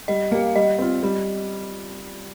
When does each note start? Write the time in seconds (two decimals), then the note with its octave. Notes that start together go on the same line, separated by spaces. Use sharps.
0.08 G3 D#5
0.31 A#3 G4 F5
0.55 G3 D#5
0.79 C4 F4
1.03 G3